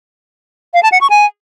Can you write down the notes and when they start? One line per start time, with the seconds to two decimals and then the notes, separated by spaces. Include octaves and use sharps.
0.74 F5
0.83 A5
0.92 F#5
1.01 C#6
1.10 G#5